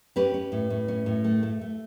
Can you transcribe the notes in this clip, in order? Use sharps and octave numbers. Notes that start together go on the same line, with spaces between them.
C#4 G4 B4
C#4
A2
A2
C#4
A2
A3
A3
A3